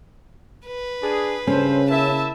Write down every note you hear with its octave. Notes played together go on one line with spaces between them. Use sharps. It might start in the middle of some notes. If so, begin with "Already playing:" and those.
B4
D4 G#4
G2 C#3 C#4 A4 C5
A#3 E4 E5 A5